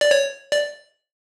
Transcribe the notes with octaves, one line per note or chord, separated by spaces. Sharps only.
D5
C#5
D5